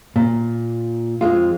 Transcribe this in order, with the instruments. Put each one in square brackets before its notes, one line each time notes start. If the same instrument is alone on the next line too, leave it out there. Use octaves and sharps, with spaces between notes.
[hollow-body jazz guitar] A#2
F2 G#3 F4